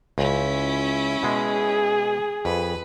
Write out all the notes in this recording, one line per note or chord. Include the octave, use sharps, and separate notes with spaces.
C#2 C#4 E4
B2 G#3 G#4
F2 B4